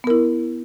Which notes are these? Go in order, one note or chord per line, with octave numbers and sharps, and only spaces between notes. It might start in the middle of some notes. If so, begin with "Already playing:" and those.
B3 E4 A#4